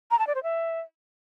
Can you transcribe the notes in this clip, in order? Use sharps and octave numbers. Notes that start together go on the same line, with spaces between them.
A#5
A5
D5
C5
E5